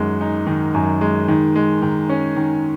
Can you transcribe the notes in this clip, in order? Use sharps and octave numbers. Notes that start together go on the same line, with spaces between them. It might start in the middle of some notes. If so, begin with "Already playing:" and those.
Already playing: F#2 D#3 G#3
D#4
D#3
F#2
G#3
D#3
G#3
D#3
C#4
D#3